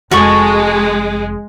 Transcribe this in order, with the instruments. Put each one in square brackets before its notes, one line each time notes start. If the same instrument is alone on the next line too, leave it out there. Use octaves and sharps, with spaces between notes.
[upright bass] F1 [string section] G#3 [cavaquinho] F#4 A4 C#6